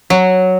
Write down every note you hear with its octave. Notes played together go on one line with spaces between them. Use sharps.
F#3